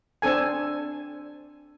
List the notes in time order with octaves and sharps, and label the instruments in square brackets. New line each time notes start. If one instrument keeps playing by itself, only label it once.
[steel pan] C4 D4 A4 G#5